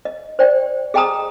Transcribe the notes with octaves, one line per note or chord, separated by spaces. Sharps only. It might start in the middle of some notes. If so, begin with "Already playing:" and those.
D#5
C5 D5 G5
G#4 D#5 G5 A5 A#5 D#6